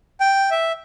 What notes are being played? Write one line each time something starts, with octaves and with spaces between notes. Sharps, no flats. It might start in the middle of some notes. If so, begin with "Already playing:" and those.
G5
E5